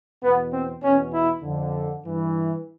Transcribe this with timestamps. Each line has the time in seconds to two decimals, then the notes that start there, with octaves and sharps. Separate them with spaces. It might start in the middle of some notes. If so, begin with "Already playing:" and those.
0.23 E2 B2 B3
0.53 C4
0.83 E2 B2 C#4
1.13 E4
1.43 F2 D3
2.03 G2 E3